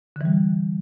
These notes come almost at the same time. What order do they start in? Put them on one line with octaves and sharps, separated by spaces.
D3 E3 G3